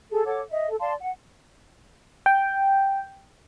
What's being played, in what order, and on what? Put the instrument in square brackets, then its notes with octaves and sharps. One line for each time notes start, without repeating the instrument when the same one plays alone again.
[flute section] G#4 A4
A4 C#5 F#5 D6
D#5 E5
A4
D5 F5 A5 C6
F#5
[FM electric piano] G5